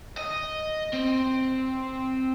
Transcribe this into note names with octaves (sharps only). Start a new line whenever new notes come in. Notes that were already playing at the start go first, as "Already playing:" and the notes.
D#5
C4